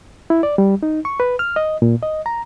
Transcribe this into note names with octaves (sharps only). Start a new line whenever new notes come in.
E4
D5
G3
D#4
C#6
B4
F6
D#5
A#2
D#5
A#5